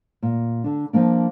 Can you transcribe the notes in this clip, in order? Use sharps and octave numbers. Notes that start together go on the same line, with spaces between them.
A#2
D3 D4
F3 G3 A#3 D4